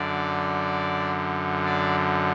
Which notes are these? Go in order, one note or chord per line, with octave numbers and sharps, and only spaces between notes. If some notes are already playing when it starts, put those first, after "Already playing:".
Already playing: F#2 D3 D5
D5